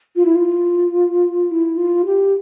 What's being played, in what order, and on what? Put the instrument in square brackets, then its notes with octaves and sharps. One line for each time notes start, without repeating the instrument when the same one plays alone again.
[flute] F4
E4
F4
E4
F4
G4